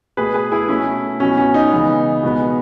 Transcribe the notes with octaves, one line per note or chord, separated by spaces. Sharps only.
B2 A3 G#4 B4
G#4 B4
E4 G#4
B2 A3 C#4 E4
B2 F#3 B3 C#4
C#4
D#4
C#3 E3 G#3 B3
B2 G#3 B3